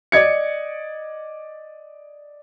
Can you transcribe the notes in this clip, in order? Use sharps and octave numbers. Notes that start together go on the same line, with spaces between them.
D5 D#5 G#6 C#7